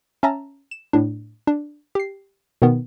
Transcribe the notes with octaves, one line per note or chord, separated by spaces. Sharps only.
C#4 E5 A5 A#5
E7
A2 D4
D4
G4 C7
B2 D#3 B3